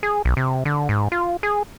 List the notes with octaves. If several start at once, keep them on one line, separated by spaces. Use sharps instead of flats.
G#4
B1
C3
D3
G#2
F4
G#4